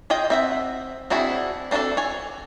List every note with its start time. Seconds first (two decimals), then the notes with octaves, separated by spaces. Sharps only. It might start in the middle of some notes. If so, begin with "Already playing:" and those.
0.10 F4 G#4 D#5 G5
0.30 C4 E5 F#5
1.10 C4 D4 E4 F#4 G#4
1.71 C4 D4 F4 F#4 A4
1.97 C#5 G#5